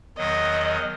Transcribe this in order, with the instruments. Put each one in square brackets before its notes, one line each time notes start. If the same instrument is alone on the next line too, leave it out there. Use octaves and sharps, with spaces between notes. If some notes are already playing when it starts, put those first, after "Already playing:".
[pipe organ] E2 D#3 F#3 [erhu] D#5